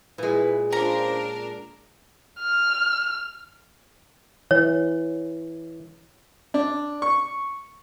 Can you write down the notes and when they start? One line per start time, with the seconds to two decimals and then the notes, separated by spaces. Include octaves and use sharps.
0.18 A#2 G#3 E4 B4
0.72 C#4 D4 F4 A#4 C5 A#5
2.41 F6
4.51 E3 C#5
6.54 D4
7.02 C#6